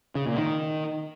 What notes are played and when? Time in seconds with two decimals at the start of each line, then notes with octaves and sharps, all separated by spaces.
0.15 C#3
0.27 A#2
0.38 D#3